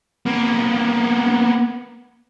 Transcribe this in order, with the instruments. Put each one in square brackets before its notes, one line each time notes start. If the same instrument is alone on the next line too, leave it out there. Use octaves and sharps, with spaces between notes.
[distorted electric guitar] A#3 B3